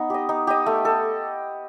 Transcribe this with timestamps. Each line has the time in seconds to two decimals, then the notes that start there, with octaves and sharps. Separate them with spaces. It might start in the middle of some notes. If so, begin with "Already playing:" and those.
Already playing: B3 D#4
0.10 G4 D#5
0.29 D#4
0.47 G4 D#5
0.66 A3
0.85 A4